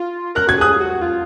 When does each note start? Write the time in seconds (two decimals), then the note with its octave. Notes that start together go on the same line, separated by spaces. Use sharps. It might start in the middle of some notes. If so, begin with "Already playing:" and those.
Already playing: F4
0.35 A#4 F#6
0.47 F#4 G#6
0.58 G#4 D#6 F#6
0.73 F4
0.80 F#4
1.01 F4